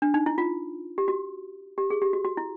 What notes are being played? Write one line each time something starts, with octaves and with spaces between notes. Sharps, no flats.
D4
D#4
E4
F4
G4
F#4
G4
G#4
G4
F#4
F#4
E4